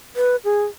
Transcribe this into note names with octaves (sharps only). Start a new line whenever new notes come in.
B4
G#4